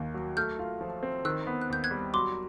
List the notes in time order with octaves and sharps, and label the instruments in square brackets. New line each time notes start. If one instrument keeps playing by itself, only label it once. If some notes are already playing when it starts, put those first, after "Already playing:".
Already playing: [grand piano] D#2 D#3 A#3
F#3
[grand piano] A3 [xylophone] F6 G6
[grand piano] F4
F3
C4
[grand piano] D#3 [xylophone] E6 F#6
[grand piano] B3
[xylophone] F#6
[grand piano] D#2 [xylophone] G6
[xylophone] F#6 G#6
[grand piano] G3
[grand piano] F#3 [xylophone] C6 D6